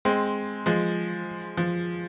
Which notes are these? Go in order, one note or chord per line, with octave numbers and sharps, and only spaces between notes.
G#3 C4
F3 G#3
F3